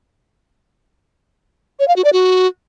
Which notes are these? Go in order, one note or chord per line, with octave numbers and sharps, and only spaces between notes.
C#5
F5
F#4
D5
F#4